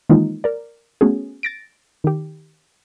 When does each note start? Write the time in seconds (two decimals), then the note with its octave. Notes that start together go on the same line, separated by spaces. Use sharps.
0.09 D#3 E3 G#3 A#3 D#4 F4
0.44 A#4 D5
1.01 A3 B3 C#4 F#4 G#4
1.43 A6 A#6 D7
2.04 D#3 G4